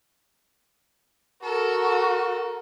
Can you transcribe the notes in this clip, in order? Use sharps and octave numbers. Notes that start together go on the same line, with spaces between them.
F#4 A4 A#4